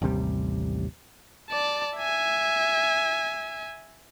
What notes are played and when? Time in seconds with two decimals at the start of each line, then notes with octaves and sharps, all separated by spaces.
0.02 A1 D#2 C3 G3
1.50 D5 A5
1.97 E5 G#5